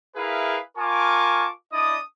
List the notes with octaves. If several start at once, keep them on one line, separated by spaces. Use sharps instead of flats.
E4 G#4 A#4 B4 E5 F5
F4 A#4 G#5 A5 C#6 D6
D4 E4 D5 D#5 D#6